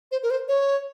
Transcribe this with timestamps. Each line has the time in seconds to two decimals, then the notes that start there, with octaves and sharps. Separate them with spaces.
0.12 C5
0.23 A#4
0.30 C5
0.48 C#5